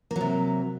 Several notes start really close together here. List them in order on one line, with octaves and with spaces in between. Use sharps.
A#3 F#3 C3